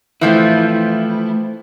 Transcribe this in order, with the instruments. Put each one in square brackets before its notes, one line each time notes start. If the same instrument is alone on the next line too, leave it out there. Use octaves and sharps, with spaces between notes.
[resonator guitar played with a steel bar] E3 F3 C4 [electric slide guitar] A3 E4